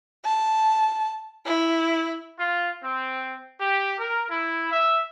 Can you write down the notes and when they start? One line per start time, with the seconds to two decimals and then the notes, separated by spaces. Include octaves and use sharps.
0.24 A5
1.46 E4
2.38 F4
2.82 C4
3.60 G4
3.98 A#4
4.29 E4
4.72 E5